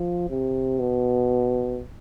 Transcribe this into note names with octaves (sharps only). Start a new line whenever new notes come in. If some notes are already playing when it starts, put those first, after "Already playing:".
Already playing: F3
C3
B2